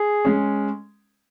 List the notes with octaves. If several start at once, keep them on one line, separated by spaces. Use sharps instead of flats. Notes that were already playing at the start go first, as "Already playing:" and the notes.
Already playing: G#4
G#3 C#4